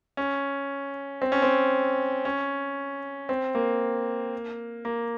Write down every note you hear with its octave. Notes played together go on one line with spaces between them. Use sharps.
C#4
C4
C#4
C4
C#4
C4
A#3
A#3